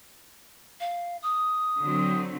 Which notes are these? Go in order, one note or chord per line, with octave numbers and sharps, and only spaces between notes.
F5
D#6
D3 F#3 C4